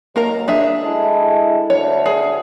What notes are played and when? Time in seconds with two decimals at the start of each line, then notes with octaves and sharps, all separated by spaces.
0.16 D#2 D#3 F#3 A#3 A#4 A#5
0.48 D4 G#4 E5
0.82 G#3 E4 A4
1.70 D2 C#5
2.06 G#4